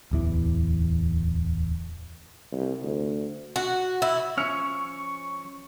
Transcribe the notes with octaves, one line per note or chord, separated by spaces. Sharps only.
D1 E2 E3
C2
D2
F#4
E4
F3 C#4 C#6 E6 C#7 F7